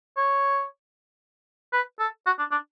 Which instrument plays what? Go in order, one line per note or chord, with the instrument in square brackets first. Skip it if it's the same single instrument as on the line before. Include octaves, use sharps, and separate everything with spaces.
[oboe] C#5
B4
A4
F#4
D4
D4